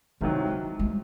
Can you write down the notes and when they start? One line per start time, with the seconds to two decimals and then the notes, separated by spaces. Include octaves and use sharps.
0.21 C2 C3 D#3 F#3 G#3
0.79 G#3